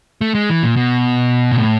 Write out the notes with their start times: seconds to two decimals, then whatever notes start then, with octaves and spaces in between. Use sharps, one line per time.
0.21 A3
0.35 G#3
0.49 E3
0.63 A#2
0.76 B2
1.52 A#2
1.58 A2